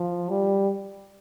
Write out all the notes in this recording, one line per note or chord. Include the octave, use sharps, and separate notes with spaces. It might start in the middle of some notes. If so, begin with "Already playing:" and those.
Already playing: F3
G3